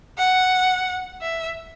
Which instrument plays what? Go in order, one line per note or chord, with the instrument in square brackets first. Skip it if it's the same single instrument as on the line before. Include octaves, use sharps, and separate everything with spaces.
[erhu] F#5
E5